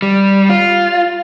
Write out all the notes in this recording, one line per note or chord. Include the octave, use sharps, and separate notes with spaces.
G3
F4